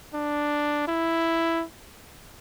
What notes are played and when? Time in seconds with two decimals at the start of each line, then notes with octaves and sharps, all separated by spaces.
0.14 D4
0.87 E4